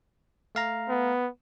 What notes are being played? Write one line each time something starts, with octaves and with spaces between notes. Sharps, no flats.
A3 F5 A#5
B3